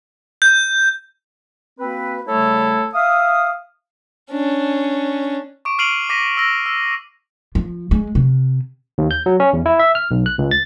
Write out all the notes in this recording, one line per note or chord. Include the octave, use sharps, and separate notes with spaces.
G6
A#3 C4 F#4 B4
C#3 G3 A3 E4 A4 C#5
E5 F5 D#6
C#4 D4
C#6 D6 D7
F6 C7 D7 D#7 F7 F#7
D6 A#6 B6 D#7
E6 A#6
E6
F3
G#3
C3
D#2
G6
F#3
C#4
E2
E4
E5
F6
B1
F#6
C#2
A6